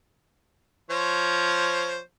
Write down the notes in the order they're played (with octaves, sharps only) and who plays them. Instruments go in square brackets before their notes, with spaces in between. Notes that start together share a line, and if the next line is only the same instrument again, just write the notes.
[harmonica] F3 C5 C#5